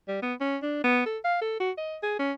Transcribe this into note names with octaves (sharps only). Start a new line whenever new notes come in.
G3
B3
C#4
D4
B3
A4
F5
A4
F#4
D#5
G#4
C#4